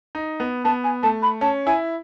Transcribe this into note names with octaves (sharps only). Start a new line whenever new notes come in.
D#4
B3
B3 A5
G#5
A3 A5
B5
C#4 A5
E4 G#5